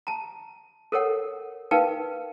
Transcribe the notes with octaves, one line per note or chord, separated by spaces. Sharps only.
A5 A#5
A4 A#4 C#5 F#5
D#4 A#4 B4 F5 G5 A5